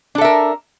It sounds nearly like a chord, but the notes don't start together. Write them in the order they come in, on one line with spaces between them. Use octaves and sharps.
D4 A4 E5 A#4